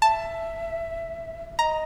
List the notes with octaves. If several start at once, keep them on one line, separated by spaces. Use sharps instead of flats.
E5 A5
D#5 A#5